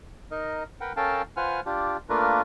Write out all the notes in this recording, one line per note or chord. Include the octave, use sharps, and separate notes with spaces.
D#4 A#4 D#5
A#4 B4 F#5 G5
C#4 A4 A#4 F5 G5 A5
F4 B4 C5 F#5 G#5 F6
D4 F4 G4
A3 A#3 D4 F4 A#4 B4